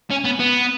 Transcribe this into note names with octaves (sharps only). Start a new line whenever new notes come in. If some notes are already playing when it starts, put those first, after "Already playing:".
C#4
B3
B3